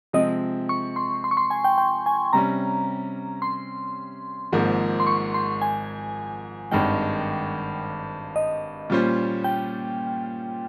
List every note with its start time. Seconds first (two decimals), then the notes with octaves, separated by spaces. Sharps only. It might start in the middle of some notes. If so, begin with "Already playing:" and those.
0.13 C3 F3 G#3 C4 D#5
0.69 C#6
0.96 C6
1.24 C6
1.31 C#6
1.37 C6
1.51 G#5
1.64 G5
1.78 G5
2.06 G#5
2.33 C3 G3 C#4 A#5
3.42 C6
4.53 G#1 G#2 F3 A#3
5.00 C6
5.07 C#6
5.34 C6
5.62 G#5
6.71 G#1 G2 D#3 G#3 G5
8.36 D#5
8.90 A#2 G3 C#4 F4 C5
9.44 G5